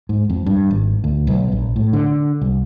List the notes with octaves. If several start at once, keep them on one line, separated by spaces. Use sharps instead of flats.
G#2
F2
G2
G#1
D2
B1
A#1
A2
D3
C2